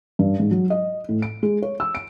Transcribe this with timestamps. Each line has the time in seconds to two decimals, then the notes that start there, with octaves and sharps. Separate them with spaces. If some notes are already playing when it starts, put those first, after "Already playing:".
0.19 G2
0.40 G#2
0.51 F#3
0.70 D#5
1.09 A2
1.22 D7
1.43 G#3
1.62 C#5
1.80 E6
1.95 D7